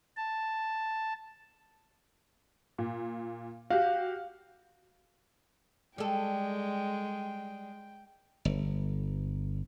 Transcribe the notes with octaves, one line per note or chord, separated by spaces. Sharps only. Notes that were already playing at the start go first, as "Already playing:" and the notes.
A5
A#2
F#4 G4 F5
G3 G#3 A4 G5
G1